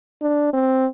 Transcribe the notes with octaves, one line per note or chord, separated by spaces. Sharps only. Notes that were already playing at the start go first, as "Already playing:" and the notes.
D4
C4